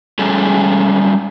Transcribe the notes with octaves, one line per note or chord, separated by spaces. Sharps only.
G3 G#3 C#4 G#4 A4